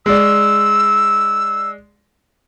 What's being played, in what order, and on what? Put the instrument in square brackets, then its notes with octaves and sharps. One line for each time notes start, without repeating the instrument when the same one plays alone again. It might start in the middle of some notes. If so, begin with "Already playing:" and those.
[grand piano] G#3 D5 [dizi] E6